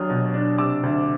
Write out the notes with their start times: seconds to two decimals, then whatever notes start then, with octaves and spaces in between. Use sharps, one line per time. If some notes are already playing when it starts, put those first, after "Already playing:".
Already playing: D#2 F#3 D4 D#6 F6
0.10 B2
0.34 D4
0.58 C3 D6 E6
0.83 D2